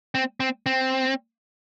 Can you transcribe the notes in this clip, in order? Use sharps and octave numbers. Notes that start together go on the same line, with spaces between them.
C4
C4
C4